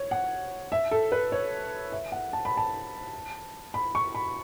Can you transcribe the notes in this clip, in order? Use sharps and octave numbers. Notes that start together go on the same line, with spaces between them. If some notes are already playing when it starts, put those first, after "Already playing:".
Already playing: C#5
F#5
E5
A4
B4
C#5
E5
F#5
A5
B5
A5
B5
C#6
B5